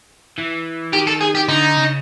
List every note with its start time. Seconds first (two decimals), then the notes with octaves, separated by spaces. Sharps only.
0.38 E3
0.93 D#3 G4
1.07 A4
1.21 G#4
1.35 G4
1.48 D3 D#4
1.77 C#3